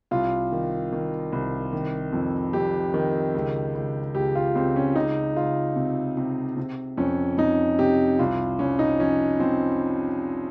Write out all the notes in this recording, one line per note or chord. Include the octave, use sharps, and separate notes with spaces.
C2 F4
D#3
D#3
C2
D#3
F2
F2 G4
D#3
C#2
C#2
C#2 G4
F4
C#2 C4
C#4
C#2 D#4
C#2 F4
C3
C3
C3
F2 C#4
F2 D#4
C3 G4
C2 F4
C2 C#4
D#4
F3 C#4
F3 C4